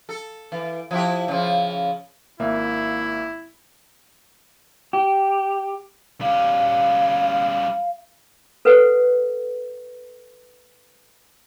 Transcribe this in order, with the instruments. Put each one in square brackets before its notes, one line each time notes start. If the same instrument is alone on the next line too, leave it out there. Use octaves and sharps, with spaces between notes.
[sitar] A4
E3
F3 E4 G4
C#3 F3
[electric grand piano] G#1 A#3 E5 [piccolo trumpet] E4
[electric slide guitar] G4
[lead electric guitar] G3 C#4 [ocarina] F5
[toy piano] A4 B4 C5 F#5